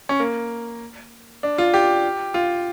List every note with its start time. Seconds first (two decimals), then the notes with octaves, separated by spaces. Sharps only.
0.09 C#4
0.20 A#3
1.43 D4
1.58 F4
1.74 G4
2.34 F4